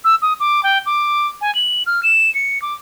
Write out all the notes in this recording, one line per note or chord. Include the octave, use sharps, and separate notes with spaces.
E6
D#6
D6
G5
D6
G#5
F#7
F6
E7
C#7
D6